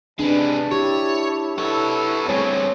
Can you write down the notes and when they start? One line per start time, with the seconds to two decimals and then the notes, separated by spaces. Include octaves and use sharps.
0.19 C3 G#3 D4 B4 A5
0.72 E4 G4 C#5
1.58 B3 E4 A4 C#5
2.29 G2 A3 C4 G#4 C#5